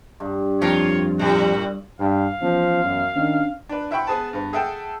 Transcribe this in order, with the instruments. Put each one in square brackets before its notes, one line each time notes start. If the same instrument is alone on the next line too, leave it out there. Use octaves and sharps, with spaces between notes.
[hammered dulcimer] G2
[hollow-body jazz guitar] F2 [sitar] F4 A#4 [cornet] C#5
[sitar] A2 G3 [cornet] F#4
[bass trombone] G2 [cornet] F5
[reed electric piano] E3 B3 C#4 [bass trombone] F3
[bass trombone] F#2
[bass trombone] D#3 [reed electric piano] C#4 D4
[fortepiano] D4 B4
E4 E5 F#5 G5 B5 C#6
B3 G#4 B4 A5
G2 B3
G#4 A4 E5 F#5 G5 A5